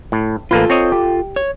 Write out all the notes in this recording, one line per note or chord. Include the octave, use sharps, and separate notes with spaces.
A2
A1 A#3 F4 A4 B4
C4 C#5 D#5
G4
C#5